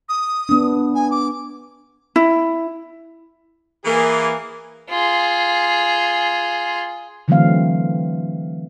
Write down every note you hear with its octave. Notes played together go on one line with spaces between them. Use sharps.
D#6
B3 D4
G#5
D6
E4
E3 A#3 G#4
F4 G#4
D3 E3 F#3 A3 C4 F5